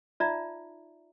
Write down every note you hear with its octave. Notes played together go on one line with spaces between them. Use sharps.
D#4 F4 D5 E5 A#5